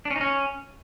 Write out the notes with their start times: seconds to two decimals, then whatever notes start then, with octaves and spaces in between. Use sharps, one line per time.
0.05 D4
0.11 C#4
0.16 D#4
0.21 C#4